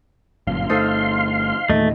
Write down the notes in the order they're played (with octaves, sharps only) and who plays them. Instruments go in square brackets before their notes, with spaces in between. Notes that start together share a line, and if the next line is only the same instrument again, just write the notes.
[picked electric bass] G1 F#2 A#2 [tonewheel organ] F5 C6
[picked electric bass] G1 A3 [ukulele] D#4 A4 C5
[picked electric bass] E2 A#2 D#3 [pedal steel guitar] A3 [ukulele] D#5